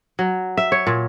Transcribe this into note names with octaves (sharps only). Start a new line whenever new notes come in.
F#3
E5
C#5
A#2